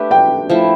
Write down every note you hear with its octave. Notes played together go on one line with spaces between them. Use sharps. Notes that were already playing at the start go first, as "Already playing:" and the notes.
Already playing: A3 D4 G4 B4
G5
F3 A3 E4